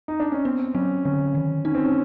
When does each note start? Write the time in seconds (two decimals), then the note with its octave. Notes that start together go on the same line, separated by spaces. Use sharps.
0.08 D#4
0.20 D4
0.32 C#4
0.45 B3 C4
0.74 F#3 C#4
1.05 D3 C#4
1.35 D#3
1.65 C#4 D#4
1.75 C4
1.85 C#4